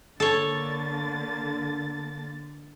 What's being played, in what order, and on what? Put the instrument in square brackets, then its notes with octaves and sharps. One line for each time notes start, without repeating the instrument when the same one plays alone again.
[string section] D3 A#3 A6 [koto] A4 C#5